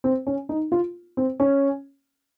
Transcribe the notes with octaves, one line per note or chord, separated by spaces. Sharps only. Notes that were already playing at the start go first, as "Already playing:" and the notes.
C4
C#4
D#4
F4
C4
C#4